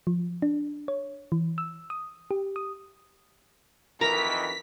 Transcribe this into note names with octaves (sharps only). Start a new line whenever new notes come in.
F3
D4
C#5
E3
E6
D#6
G4
D#6
F2 D#3 E3 A#4 A#5 B6